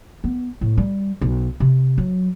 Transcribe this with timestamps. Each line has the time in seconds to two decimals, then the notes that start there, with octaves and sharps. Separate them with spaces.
0.24 B3
0.61 A2
0.77 G3
1.21 B1
1.60 C3
1.98 F#3